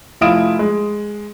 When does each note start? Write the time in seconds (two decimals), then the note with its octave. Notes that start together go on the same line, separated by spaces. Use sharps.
0.21 F1 E4 F4 D#6 D7 E7
0.59 G#3